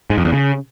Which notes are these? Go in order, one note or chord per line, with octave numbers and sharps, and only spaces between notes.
G#2
F2
E2
C#3